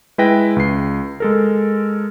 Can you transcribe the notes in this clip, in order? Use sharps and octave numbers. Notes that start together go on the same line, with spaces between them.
G#3 E4 B4 G5 A#6
C#2 C7
G#3 A4 A#4